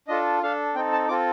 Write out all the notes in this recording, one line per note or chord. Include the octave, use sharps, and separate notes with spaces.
D4 F4 A4 D#5
D4 A4 F5
C4 D#4 A4 G5
A5
C4 F4 A4 D6